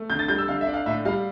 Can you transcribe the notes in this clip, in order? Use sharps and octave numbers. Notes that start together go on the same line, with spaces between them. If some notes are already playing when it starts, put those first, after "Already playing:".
Already playing: A3
D3 G6
A6
G3 G6
E6
D3 F5
E5
D4
F5
A2 E5
G3 F5